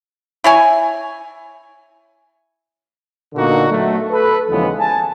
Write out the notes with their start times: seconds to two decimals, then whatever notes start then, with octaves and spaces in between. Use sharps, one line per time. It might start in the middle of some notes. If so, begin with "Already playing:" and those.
0.44 E4 C#5 G#5
3.35 A#2 D3 A#3 B3 D#4 F#4
3.70 F#3 A3
4.11 A4 B4
4.49 D#2 C#3 E3 F3 G#3 B3
4.78 G#5 A5